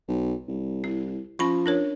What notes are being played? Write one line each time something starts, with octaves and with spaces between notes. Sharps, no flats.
B1
C2
E4
F3 C#4 B5 C#6
D4 A#4 C#5